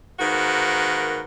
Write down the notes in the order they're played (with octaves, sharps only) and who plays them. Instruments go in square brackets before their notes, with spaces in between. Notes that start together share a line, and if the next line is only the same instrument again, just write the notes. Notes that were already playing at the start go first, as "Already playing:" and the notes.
[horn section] G#2 D#3 A#3 F#4 A#4 B4